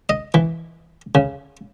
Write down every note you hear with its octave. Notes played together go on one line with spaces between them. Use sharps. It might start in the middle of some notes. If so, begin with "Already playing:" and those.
D#5
E3
C#3